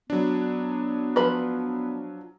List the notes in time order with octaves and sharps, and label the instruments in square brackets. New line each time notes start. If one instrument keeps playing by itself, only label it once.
[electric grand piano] F#3 D4 [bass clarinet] B3
[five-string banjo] F3 B4 B5